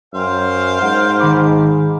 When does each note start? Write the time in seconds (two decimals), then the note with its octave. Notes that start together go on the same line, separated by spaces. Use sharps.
0.14 F#2 C5 F5 G5
0.82 G#2 F#5
1.20 D#3 B5 D6